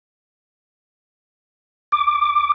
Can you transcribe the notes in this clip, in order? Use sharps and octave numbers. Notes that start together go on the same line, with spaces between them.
D6